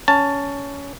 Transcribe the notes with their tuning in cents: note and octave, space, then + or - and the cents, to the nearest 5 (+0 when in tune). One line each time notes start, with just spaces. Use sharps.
C#4 +20 A5 +10